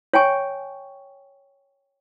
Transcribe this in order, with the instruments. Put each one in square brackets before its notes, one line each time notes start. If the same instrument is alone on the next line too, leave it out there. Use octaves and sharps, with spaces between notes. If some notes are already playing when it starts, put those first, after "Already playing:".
[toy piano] C#5 G5 G#5 C#6